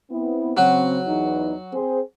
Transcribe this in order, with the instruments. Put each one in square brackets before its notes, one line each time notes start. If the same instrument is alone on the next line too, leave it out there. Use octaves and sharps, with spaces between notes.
[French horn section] B3 C4 E4
[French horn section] C#3 C4 [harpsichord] F#3 F#4
[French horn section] E2 E3 D#4
C4 G#4 C5